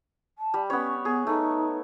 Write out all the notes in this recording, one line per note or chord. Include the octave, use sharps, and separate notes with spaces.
A5
G3
B3 C#4 C#5
B3 G#4
A3 D#4